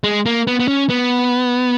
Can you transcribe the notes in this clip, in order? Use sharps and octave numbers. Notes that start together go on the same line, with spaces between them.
G#3
A#3
B3
B3
C#4
B3